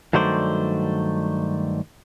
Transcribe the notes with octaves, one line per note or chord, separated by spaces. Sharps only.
G2 D#3 F#3 A3 C5 D5